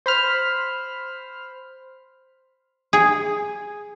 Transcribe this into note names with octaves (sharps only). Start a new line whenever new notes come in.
C5 B5 F6
G#4